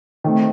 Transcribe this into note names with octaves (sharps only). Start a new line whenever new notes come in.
D#3 A3 C4